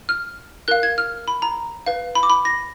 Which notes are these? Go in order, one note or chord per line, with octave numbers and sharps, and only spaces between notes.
F6
A#4 F5 F#6
G#6
F6
B5
A#5
B4 F5
B5
D6
B5
A#6